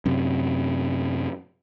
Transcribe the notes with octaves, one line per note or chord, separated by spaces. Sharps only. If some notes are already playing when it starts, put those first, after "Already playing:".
F#2 C3